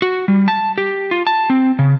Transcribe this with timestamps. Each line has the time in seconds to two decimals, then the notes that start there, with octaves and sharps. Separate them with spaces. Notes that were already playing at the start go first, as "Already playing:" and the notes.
0.02 F#4
0.28 G3
0.48 A5
0.78 G4
1.11 F4
1.27 A5
1.50 C4
1.79 C#3